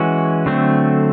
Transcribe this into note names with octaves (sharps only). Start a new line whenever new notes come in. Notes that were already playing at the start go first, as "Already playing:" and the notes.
Already playing: E3 G#3 C#4 F#4
D3 F#3 A3 C4